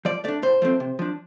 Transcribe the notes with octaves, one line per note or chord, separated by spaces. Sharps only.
F3 D5
A3 D4 D5
A2 C5
F3 A3 C4
C3
F3 D4